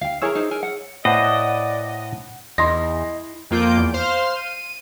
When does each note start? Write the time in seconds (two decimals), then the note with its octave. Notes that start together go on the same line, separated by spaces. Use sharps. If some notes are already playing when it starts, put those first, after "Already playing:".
0.01 D2 F5 G5
0.22 E4 G#4 A#4 C#5 A#5 E6
0.35 D#4 C5
0.51 A#4 G#5
0.63 F#5
1.05 A2 B4 C5 D5 D#5 F#5
2.58 E2 E4 D#5 C6 A#6
3.51 F2 A#3 F4 D6 G6 D7
3.78 E2
3.94 C5 F5 C6 F6
4.37 D#7